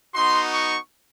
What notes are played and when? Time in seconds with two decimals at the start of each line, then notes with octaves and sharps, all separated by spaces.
0.14 B3 D#4 F#4 C6
0.53 C#6